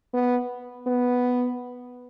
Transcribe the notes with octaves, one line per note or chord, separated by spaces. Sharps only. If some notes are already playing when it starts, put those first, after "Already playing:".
B3
B3